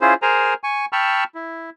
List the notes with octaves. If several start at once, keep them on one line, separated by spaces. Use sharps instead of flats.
C#4 E4 F4 G#4 C5
G#4 A#4 C5 G#5 A#5
G#5 C#6
G5 A5 B5 C#6 E6 F6
E4